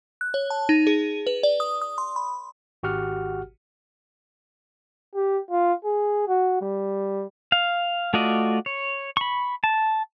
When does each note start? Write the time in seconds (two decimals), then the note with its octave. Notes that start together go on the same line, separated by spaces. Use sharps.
0.21 F#6
0.34 C#5
0.50 A5
0.69 D#4
0.87 G#4
1.27 B4
1.43 D5
1.60 D#6
1.82 D#6
1.98 C6
2.16 B5
2.83 G#1 F#4 G4 F#5 F6
5.15 G4
5.51 F4
5.85 G#4
6.28 F#4
6.61 G3
7.52 F5
8.14 A3 F4 F#4 D5 D#5
8.66 C#5
9.17 B5 C#6
9.64 A5